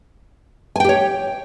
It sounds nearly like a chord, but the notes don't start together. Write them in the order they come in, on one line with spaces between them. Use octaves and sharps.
G#5 G5 G4 C#5